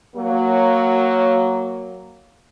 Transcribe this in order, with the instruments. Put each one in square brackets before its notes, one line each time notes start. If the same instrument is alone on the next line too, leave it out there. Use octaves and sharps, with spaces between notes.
[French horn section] F#3 A#3